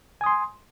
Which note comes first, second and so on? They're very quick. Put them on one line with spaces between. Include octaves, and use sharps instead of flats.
G#5 D#6 C6